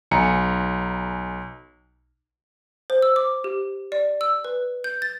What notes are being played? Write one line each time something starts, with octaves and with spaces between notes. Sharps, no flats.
B1 G#5 A#5 C#7
C5
E6
D6
G4
D5
E6
B4
G6
A6